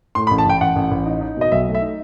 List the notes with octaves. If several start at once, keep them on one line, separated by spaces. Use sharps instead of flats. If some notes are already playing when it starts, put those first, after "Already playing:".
A2 C6
B5
A1
A5
A1 G5
A1 F#5
A1
A1
D#4
D#4
B2 D#5
B1 E5
A3
E5
D#4